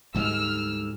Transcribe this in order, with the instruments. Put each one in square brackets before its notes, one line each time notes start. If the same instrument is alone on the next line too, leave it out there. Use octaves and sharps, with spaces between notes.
[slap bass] D2 G#2 G3 [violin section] E6 F6